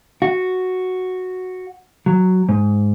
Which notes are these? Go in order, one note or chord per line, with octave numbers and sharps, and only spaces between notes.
F#4
F#3
G#2